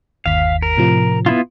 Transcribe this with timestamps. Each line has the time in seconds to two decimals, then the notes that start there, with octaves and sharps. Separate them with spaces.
0.26 G1 D#2 F5 B6
0.62 A#4
0.77 A2 C3 F3
1.26 B3 E4 F4